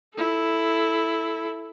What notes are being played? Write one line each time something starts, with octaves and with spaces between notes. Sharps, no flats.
E4 A4